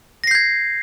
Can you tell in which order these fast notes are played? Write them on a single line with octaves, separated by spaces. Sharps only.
A#6 C7 G6 G#6